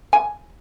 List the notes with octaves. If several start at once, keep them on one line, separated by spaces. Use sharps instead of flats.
G#5